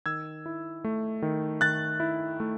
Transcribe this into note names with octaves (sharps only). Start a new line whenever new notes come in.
D#3 E6 G#6
E4
A3
D#3
D#3 F#6 A6
E4
A3